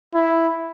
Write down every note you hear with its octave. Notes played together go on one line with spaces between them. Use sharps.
E4